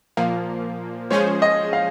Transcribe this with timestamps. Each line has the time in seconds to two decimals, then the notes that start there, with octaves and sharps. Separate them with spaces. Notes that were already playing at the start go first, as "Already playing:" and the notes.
0.17 A#2 F3 A#3 F5
1.10 F3 G#3 C#4 G#4 C5 C#5
1.42 D#5
1.73 F5